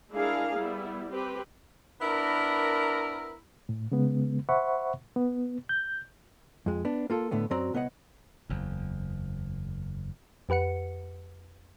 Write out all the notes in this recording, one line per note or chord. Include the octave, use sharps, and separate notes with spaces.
G#3 D4 E4 G#4 A#4 F5
G3 B3 E4
C4 G4 B4
B3 D4 E4 A#4
A2
C#3 G#3 B3
C5 E5 F#5 B5 C#6
B3
G6
F2 G#3
B3 D4
A#3 F4 A4
A2 D3 A3 B3
F#2 F#3 C4 F#4 D5 A#5
C2 B3 C#5 D#5 F#5
F#1 E2
F2 G4 B4 F#5 C#7